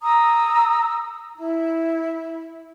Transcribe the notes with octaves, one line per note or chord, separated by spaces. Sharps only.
A#5 D#6 E6
E4